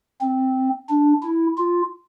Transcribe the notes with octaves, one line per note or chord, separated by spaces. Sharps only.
C4
D4
E4
F4